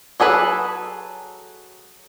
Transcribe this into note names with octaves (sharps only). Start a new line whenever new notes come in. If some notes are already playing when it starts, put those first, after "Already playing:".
F#3 G#4 A4 B4